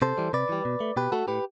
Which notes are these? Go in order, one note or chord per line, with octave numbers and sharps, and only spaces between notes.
C3 A4 C5
E3 G3
C3 B4 D5
E3 G3
B2
A3
B2 G4 B4
A3 F#4 A4
A2 G4 B4